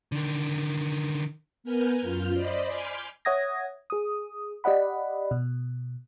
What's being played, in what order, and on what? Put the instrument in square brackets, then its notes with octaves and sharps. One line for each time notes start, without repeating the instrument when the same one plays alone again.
[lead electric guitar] D3 D#3
[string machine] B3 A#4 B4 G#5 F6 G6
F#2 F4 F6 G6
C5 D5 D#5 B5
G#5 B5 C6 D6 F6 G6
[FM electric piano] C#5 E5 F#5 D#6 G#6 A#6
G#4 D#6
G4 D5 D#5 F#5 B5
B2